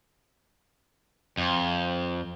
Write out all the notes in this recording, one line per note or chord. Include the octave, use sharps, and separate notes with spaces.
F2